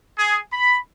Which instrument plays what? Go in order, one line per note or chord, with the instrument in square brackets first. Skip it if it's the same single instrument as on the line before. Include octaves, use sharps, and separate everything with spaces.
[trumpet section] G#4
B5